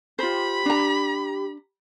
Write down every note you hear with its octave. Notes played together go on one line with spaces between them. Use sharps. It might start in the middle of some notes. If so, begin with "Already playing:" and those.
F4 G4 C5 B5
D4 A#5